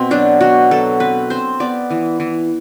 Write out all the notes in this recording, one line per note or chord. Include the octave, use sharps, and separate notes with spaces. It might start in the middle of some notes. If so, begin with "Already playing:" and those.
Already playing: B2 C4
F#3 D4
B2 F#4
F#3 A4
C4 B4
C4 C5
B3 D5
E3
E3